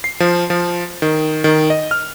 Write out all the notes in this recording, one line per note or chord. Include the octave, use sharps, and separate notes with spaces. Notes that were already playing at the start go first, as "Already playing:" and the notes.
C7
F3
F3
D#3
D#3
D#5
F6